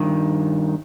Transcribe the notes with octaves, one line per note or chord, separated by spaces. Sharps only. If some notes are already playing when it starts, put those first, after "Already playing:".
Already playing: G2 D#3